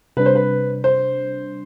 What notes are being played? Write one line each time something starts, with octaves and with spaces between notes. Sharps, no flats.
C3 G3 D4 B4
C5
B4
C5